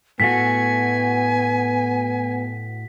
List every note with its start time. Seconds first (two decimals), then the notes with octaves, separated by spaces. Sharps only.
0.20 A2 A3 B3 F#4 G#5 B6